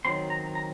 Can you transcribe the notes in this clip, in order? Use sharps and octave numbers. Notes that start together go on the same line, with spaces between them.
D#3 F#3 C4 C6
A#5
A#5